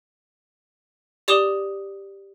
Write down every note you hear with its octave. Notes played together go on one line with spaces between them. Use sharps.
G4 D5 D6 D#6 E7 G7